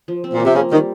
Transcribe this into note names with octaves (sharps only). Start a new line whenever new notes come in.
F3
C4
A#2
F3
C3
C#3 A#3
D#3 G3